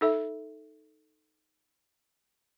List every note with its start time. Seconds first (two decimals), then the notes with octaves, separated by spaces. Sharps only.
0.01 D#4 A4 E5